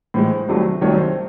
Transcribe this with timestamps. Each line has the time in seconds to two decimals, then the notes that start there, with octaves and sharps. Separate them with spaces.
0.14 A2 E3 G#3 C5
0.48 C2 C3 D#3 F#3 A3
0.81 C2 C3 D#3 F#3 A3 C#5
0.98 C5